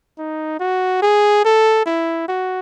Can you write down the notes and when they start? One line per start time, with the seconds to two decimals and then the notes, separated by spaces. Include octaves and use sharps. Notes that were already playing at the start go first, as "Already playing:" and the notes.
0.18 D#4
0.60 F#4
1.02 G#4
1.45 A4
1.86 E4
2.28 F#4